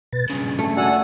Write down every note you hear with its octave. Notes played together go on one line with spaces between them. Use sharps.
B2 B4 A6
G2 C#3 G#5
A3
F#4 D5 F#5 G#5 A5 E6